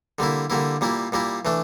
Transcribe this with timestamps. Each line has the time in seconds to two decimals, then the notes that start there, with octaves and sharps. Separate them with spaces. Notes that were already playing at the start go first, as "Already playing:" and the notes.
0.19 D3 G3 A#3 E4
0.50 D3 G3 A#3 E4
0.81 A#2 G3 A#3 E4
1.12 A#2 G3 A#3 E4
1.45 E3 A3 D4